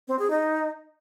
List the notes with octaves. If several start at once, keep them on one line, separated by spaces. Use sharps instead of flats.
C4
G#4
D#4